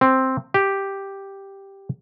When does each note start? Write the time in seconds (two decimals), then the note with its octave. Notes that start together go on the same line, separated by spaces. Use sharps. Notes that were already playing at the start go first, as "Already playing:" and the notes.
0.01 C4
0.54 G4